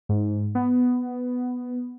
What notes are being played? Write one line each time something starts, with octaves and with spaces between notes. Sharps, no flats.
G#2
B3